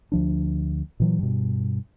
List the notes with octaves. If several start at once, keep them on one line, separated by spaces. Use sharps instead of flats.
D2 F3 D4
A#2 E3 F#3
G2 B2